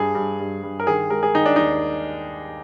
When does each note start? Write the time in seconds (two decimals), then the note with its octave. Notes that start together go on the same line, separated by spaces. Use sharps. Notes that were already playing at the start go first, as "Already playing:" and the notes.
Already playing: G2 G#4
0.15 G2
0.39 G2
0.63 G2
0.80 A#4
0.87 D#3 G#4
1.10 G#3 A#4
1.23 G#4
1.35 D#3 D#4
1.46 D4
1.56 D#2 D#4